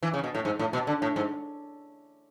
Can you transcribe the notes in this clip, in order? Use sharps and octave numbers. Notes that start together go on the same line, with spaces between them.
E3
C#3
B2
A2
G#2
A2
B2
D3
A2
G#2